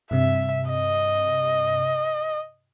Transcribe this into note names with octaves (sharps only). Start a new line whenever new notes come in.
G2 C3 E5
D#5